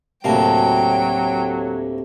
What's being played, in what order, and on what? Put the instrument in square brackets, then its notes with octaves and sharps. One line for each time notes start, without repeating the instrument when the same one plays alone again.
[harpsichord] D2 A2 A#3 [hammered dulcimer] C3 A5 [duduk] F#3 [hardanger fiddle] G5